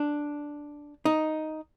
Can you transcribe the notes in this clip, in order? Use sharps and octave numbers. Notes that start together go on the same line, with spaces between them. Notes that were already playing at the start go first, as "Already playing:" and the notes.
Already playing: D4
D#4